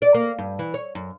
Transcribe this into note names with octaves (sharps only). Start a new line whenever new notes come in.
D5
A#3
G2
E3
C#5
F#2